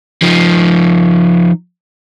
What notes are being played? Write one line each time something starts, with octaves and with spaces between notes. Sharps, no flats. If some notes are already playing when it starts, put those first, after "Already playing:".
F3 D#4